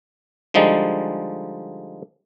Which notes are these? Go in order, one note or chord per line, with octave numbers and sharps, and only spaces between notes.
D3 F3 G3 G#3 D#4